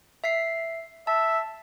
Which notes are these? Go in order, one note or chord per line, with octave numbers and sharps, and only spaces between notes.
E5 B6 C7
E5 A5